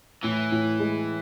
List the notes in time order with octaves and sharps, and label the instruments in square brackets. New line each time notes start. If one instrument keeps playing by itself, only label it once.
[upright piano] A2 [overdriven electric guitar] E3
[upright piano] A2
G#3